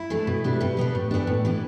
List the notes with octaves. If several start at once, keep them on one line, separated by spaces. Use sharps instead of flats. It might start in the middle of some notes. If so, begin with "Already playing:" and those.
Already playing: E4
E3 A3 D4
B2
G3 B3 D4
B2 G4
G3 B3 D4
A2
E3 B3 D4
A2
E3 B3 D4